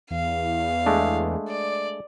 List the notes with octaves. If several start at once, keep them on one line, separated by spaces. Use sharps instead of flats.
E2 F5
G#3 A3 D4
D5